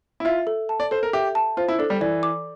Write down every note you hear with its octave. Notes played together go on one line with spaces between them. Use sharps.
E4
F4 E5
A4
A5
D5
A4 C5
A#4
G4 E5
A5
F4 C5
E4
D4 A4
G3
E3 D5
D6